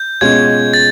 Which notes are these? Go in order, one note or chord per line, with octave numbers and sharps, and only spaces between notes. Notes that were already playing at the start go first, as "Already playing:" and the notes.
Already playing: G6
B2 G#3 C#4 F4 G#6
A6